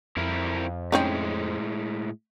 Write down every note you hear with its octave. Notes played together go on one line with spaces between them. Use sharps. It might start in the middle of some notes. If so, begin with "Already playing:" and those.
F2 C4 E4 A#4
A2 G#3 C4 C#4 D#4